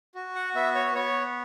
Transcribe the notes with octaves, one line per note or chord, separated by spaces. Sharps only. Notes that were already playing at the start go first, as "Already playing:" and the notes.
F#4
F#5
B3 E5
C#5
B3 C#5